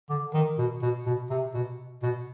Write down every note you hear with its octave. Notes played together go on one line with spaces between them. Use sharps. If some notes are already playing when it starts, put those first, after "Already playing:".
D3
D#3
B2
B2
B2
C3
B2
B2